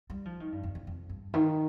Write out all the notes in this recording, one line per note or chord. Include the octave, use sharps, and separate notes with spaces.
G3
F3
D#3
G2
F2
F2
F2
G2
D#3